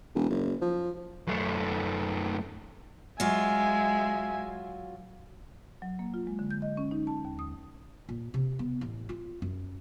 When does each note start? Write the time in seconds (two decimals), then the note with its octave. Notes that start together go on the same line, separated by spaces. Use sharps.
0.15 E1
0.30 F#1
0.62 F3
1.27 F#2 A3
3.20 F#3 G#3 F4 E5 G#5
5.82 F#3
5.99 A#3
6.14 F4
6.27 G#3
6.39 D3
6.51 G6
6.62 D#5
6.77 C#4
6.91 D#4
7.07 A5
7.25 D#2
7.39 D#6
8.09 A#2
8.34 C3
8.59 B3
8.81 A1
9.09 F4
9.42 F#2